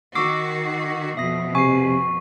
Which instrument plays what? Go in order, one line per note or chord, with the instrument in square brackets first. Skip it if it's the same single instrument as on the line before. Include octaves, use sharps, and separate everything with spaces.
[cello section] D#3 F#4 [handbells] C#6 D6 E6 [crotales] C7
[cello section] F2 B2 [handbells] E5 D#6 A#6
[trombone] C3 [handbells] G#5 C7 [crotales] C#6